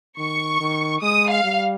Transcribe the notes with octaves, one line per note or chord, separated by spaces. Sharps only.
D#3 C#6
D#3
G#3 D#6
F5
G3